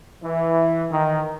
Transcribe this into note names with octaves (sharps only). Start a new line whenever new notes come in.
E3
D#3